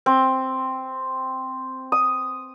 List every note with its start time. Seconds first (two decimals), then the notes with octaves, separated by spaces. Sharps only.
0.06 C4
1.92 D#6